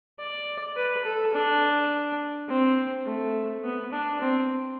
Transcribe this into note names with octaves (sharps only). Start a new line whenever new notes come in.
D5
B4
A4
D4
C4
A3
B3
D4
C4